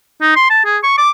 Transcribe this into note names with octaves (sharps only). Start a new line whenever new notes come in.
D#4
C6
A5
G#4
C#6
D6